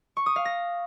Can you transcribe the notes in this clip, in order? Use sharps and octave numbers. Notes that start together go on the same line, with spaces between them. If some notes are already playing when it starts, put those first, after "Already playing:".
C#6
D#6
F5
A#6